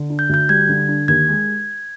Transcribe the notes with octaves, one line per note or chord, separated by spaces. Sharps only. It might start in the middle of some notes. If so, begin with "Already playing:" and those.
Already playing: D3
D4
G6
D2 G6
G3 G#6
D3
D4
D#2 G#6
G#3